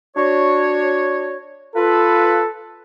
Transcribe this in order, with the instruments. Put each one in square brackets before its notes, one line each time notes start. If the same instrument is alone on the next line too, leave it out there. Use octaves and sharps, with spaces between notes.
[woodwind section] D4 F#4 C#5
[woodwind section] F4 B4 [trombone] A4